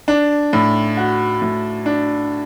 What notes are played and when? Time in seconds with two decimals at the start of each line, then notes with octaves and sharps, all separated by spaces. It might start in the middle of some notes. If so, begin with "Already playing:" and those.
0.08 D4
0.53 A2
0.97 F#4
1.42 A2
1.86 D4